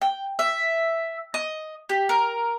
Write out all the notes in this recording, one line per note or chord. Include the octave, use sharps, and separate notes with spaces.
G5
E5
D#5
G4
A#4